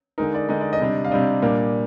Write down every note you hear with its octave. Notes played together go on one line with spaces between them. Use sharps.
D3 G#3 D#4 A#4
D5
D3 G#3 D#4 D#5
D5
D#5
C3 G3 D4
F5
C3 G3 D4 D#5
A#2 G3 A#3 D4